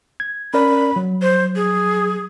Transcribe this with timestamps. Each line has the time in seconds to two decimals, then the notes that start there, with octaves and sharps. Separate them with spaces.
0.20 G#6
0.54 C#4 A#4 D5 B5
0.96 F#3
1.22 C5
1.56 G#4